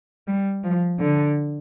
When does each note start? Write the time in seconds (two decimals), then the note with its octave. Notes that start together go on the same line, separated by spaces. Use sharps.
0.27 G3
0.64 F3
1.00 D3